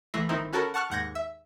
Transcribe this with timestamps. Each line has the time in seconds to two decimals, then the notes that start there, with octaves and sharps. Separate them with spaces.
0.14 C2 E3 A3 E5 A#6 C7
0.29 G1 D#3 C4 D#4 E4 E7
0.53 C#4 F#4 A4 A#4 A5 B5
0.74 F#5 A5 C#6 F6 F#6
0.90 D#2 G#2 F#5 G6 G#6 A#6
1.15 E5